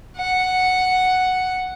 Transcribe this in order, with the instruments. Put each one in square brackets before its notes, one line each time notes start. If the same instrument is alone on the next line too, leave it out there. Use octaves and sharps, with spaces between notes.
[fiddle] F#5